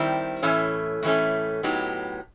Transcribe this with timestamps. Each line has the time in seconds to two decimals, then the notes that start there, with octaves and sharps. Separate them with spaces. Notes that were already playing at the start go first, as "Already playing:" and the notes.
Already playing: D#3 G3 C4 E4 G4
0.43 A2 E3 A3 C#4
1.03 A2 E3 A3 C#4
1.63 A2 F#3 B3 D#4 G4